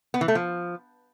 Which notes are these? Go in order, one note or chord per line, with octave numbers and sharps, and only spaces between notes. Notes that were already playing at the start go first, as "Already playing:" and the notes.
B3
E3
A3
F3